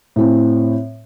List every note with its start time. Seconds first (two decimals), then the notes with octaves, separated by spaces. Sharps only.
0.16 A2 C4